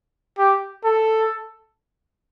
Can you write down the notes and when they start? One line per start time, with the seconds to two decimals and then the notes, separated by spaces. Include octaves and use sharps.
0.38 G4
0.84 A4